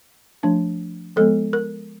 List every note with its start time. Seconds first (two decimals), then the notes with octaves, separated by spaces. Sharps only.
0.43 F3 A3 D4
1.16 F3 G#3 B3 A4
1.53 A#4